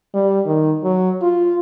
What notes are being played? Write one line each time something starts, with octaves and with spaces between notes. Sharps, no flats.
G3
D#3
F#3
F4